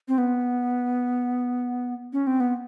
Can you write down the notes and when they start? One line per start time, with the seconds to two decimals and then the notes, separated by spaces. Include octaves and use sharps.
0.08 C4
0.18 B3
2.13 C#4
2.27 C4
2.40 B3